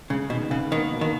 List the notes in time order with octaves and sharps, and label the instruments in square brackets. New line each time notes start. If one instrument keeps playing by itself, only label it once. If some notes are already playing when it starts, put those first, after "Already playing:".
[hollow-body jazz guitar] C#3 [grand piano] G#3
[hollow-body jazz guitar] B2 [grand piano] D#3
[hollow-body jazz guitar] C#3 [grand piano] B3
[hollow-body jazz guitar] D#3 [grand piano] A#3
[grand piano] B2
[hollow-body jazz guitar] D#3